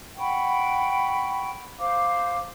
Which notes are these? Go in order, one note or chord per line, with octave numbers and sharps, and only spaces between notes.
F#5 G5 B5 C#6
C5 F5 D6